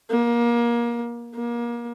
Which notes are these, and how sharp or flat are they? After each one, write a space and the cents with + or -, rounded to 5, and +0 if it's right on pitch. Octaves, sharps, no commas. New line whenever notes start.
A#3 +25
A#3 +30